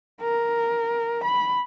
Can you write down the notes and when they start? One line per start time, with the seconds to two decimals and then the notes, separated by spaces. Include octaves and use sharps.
0.22 A#4
1.24 B5